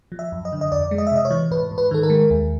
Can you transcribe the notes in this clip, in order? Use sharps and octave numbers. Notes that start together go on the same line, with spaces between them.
F3
E5
F#2
D#5
D3
D#5
F2 D5
G#3
D#5
E5
C3 D#5
C#5
E3
G#2 B4
G#2
B4
D#3 A4
A#4
G#3
D#2